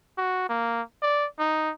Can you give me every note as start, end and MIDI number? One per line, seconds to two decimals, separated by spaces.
0.18 0.46 66
0.49 0.82 58
1.03 1.26 74
1.39 1.71 63